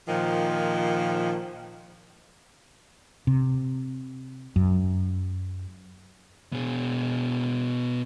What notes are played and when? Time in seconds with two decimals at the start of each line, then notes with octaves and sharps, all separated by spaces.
0.08 A#2 D#3 F3
3.27 C3
4.56 F#2
6.53 B2 G#4